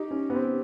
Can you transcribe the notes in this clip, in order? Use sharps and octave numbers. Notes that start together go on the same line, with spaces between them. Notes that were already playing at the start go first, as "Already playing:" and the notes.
Already playing: D#4 G4
C#4
B3
C4